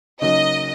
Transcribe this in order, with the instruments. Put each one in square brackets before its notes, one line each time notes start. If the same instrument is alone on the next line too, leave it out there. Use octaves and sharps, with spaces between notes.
[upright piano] C#3 F#3 A#3 D#4 F#4 [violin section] D#5